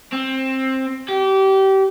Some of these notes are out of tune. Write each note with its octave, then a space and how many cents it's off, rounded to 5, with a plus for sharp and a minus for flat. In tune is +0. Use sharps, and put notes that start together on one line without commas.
C4 +15
G4 -25